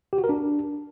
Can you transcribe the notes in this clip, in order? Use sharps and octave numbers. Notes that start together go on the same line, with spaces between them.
G4
F#4
A#4
D4